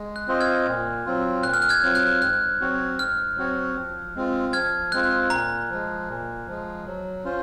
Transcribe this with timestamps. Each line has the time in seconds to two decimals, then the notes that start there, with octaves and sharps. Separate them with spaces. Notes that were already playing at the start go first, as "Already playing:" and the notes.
Already playing: G#3
0.16 F#6
0.27 C4 F4 C5 D#5
0.40 F6 G#6
0.67 A#2
1.05 F#3 C4 F4
1.43 A#2 F#6
1.54 F6
1.62 F#6
1.69 F6 G#6
1.82 F#3 C4 F4
1.95 F#6
2.21 G#2 F#6
2.61 F#3 C4 F#4 C#5
2.99 G#2 F6
3.37 F#3 C4 F#4 C#5
3.75 F3
4.15 G#3 C4 F4
4.53 F3 F6 G#6
4.92 G#3 C4 F4 F#6
5.30 A#2 A#5
5.70 F3 G#3
6.08 A#2
6.47 F3 G#3
6.86 F#3
7.24 C#4 F4 C5